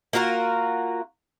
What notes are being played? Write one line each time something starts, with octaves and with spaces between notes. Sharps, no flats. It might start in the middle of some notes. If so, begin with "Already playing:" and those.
A#3 F4 F#4 A#4